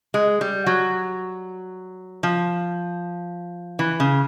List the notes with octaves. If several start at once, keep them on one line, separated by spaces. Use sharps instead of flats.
G#3
G3
F#3
F3
E3
C#3